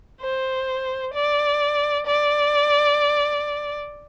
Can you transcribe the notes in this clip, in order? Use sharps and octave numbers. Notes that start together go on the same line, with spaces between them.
C5
D5
D5